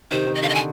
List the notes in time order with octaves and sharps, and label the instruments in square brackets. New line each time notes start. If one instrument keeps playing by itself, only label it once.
[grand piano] C3 D#3 [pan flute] C5
[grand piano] C3 D#3
[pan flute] D#5
[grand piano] D3 [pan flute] F5
[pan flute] D#5
G#5